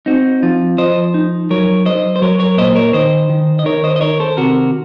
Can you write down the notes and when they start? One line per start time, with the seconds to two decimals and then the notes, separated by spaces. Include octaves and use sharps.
0.06 C4 D#4 F#4
0.42 F3 F4
0.78 F3 C5 D#5
1.14 D#4
1.50 F#3 A#4 C#5
1.86 F#3 C5 D#5
2.16 C5
2.22 F#3 A#4 C#5
2.39 A#4 C#5
2.58 A#2 C5 D#5
2.75 A#4 C#5
2.93 D#3 C5 D#5
3.30 D#3
3.59 D#5
3.65 D#3 A#4 C#5
3.84 C5 D#5
3.96 D#5
4.01 D#3 A#4 C#5
4.20 A4 C5
4.37 C3 F#4 A#4